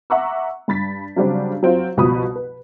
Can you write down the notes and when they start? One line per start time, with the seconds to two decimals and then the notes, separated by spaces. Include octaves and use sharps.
0.10 E5 F#5 A#5 C#6 D6 E6
0.68 G2 B5 A6 B6
1.16 C#3 F#3 G3 C4 D4
1.63 F#3 C4 F4
1.97 C2 B2 F3 B5 D#6
2.36 B4